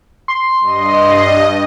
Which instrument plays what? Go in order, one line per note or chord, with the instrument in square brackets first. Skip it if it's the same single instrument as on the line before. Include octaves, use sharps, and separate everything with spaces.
[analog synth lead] C6
[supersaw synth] G2 D#5